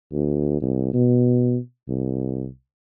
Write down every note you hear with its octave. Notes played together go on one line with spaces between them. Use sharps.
D2
C2
B2
C2